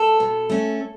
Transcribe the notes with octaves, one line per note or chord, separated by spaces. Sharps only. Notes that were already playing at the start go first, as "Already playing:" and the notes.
Already playing: A4
B2
A3 C#4